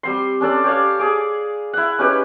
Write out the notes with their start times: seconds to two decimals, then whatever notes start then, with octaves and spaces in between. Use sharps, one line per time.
0.03 G3 C4 C6
0.41 C#4 D4 A4 D5
0.64 G4 C#5 D5 F5
0.99 G#4 D6
1.73 E4 F#5
1.99 C#4 D#4 G4 B4